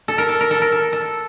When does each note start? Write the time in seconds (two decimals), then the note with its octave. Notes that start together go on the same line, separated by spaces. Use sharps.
0.08 A4
0.18 A#4
0.29 A4
0.40 A#4
0.51 A4
0.61 A#4
0.72 A4
0.93 A4